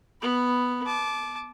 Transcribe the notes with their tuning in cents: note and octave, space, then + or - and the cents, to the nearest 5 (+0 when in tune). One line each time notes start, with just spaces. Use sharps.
B3 +0 B5 +0
A5 -30 D6 +0